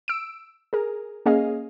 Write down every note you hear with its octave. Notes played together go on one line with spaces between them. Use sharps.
E6 D7
G#4 A#4
A#3 C#4 G#4 D#5 F5